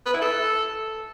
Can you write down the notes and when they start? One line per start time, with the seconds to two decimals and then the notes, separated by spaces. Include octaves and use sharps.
0.06 B4
0.14 E4
0.21 A4